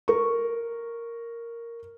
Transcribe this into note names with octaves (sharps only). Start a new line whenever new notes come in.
A#4 C#6